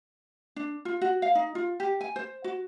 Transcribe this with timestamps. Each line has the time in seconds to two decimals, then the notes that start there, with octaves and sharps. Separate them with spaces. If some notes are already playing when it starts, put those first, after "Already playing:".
0.56 D4
0.85 F4
1.01 F#4
1.22 F5
1.35 D#4
1.55 F4
1.80 G4
2.01 G#5
2.16 C5
2.44 F#4